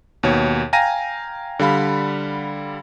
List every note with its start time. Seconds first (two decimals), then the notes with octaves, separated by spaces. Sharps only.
0.23 D#2 B2 C#5
0.73 F5 G5 G#5 A#5 A#6 D#7
1.59 D3 G3 F5 B5